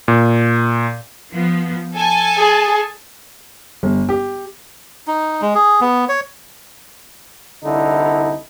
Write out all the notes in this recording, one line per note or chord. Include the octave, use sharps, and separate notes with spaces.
A#2
F3 B3
A4 G#5 A5
G#4
G1
G4
D#4
G#3
G#4
B3
C#5
C2 D3 D#4 E4